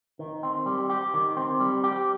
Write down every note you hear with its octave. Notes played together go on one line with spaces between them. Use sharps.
D#3
C4
G3
G4
D#3
C4
G3
G4